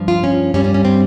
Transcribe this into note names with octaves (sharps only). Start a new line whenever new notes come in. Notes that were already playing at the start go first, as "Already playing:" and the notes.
Already playing: G2 F3
F4
C#4
G2 G3 C#4
C#4
C#4
C4